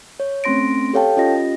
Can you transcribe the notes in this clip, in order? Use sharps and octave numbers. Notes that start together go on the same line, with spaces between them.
C#5
A3 C4 C#4 C6 A#6 D7
G4 A4 C#5 F5 G5 A5
C#4 F4 G4 D#5 A#6